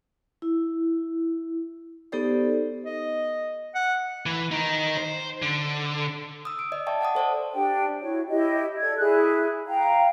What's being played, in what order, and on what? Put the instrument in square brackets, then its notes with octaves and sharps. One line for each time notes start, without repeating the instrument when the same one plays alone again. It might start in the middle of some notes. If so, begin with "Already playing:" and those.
[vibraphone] E4
B3 D#4 G4 A4 C5 D5
[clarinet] D#5
F#5
[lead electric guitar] E3
D#3 D#4
C5
D3
[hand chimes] D#6 E6
D7
D5 D#5
D5 E5 G5 A5 C#6
D5 F#5 A5 D#6
A4 C5 D5 A5
[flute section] D4 G4 G5
E4 F#4 C#5
E4 G4 D#5
A4 D5 G#6
E4 G#4 F#6
F5 G5 A#5